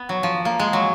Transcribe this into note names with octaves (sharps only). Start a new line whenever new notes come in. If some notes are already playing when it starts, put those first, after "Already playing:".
Already playing: B3
F#3
F3
A#3
G#3
F#3